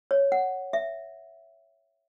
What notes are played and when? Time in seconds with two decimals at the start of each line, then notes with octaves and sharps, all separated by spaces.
0.11 C#5
0.32 F#5
0.73 E5